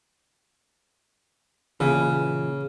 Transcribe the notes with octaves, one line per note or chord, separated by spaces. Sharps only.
A#2 C#3 E3